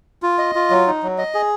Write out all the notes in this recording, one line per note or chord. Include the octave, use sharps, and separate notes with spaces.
F4
D#5
F4
F#3
D#4
F#3
D#5
G#4